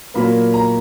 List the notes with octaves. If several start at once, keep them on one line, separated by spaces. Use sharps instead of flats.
A#2 F#3 A#3 B5
A#5